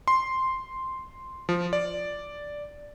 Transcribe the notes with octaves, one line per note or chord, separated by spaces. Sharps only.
C6
F3
D5